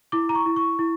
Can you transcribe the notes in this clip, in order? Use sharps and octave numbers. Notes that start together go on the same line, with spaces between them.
E4 D6
A#5
C#6
E4
C#6
E4